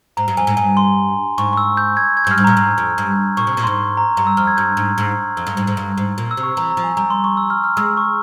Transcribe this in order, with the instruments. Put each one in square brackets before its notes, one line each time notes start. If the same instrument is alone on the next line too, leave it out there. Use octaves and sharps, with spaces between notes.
[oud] G#2 [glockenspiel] A#5
[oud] G2
[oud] F2 [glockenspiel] G#5
[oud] G#2
[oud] G2 [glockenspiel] G#5
[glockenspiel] C6
[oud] G#2 [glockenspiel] C#6
[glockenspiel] C#6
E6
G6
G#6
G#6
[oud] G2 [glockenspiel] G6
[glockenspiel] F6
[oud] G#2
[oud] A#2 [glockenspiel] A#5
[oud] G#2
F2
G2
[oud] A#2 [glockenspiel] C#6
[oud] C3
A#2
[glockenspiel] C6
[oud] G#2
[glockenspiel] A#5
[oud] G2 [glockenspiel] A#5
[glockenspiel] E6
[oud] F2 [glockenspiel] F6
[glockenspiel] G#6
[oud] G2 [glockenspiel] G6
[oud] G#2
G#2
F2
G2
G#2
G#2
G2
G#2
A#2
[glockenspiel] E6
[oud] C3
[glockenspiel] C#6
[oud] E3 [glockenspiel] A#5
[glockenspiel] A#5
[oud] F3
[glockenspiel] G#5
[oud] G3 [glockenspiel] A#5
[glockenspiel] C6
C#6
E6
F6
F6
[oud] G#3 [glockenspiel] E6
[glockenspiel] C#6